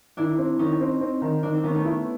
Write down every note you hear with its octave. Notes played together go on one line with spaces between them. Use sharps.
D#3 D4 E4
C4
D#3 C#4 D#4
C4
C4
D#3
D#3 C4 D4
C4 D4
D#3 B3 C#4
A3 B3
E4